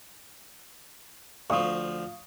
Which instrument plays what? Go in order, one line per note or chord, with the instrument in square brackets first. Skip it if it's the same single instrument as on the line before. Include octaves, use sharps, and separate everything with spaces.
[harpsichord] D2 F3 [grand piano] F5 [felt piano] C#6 D#6